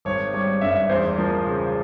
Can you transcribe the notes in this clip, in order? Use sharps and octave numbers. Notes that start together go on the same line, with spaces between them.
G#1 C#5
G3 C#5
G2 E5
E2 C5
F3 A#4
C#3